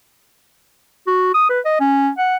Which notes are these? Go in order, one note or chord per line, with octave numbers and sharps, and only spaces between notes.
F#4
D#6
B4
D#5
C#4
F#5